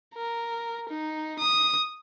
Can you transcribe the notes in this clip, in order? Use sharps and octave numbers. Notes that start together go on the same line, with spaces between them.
A#4
D#4
D#6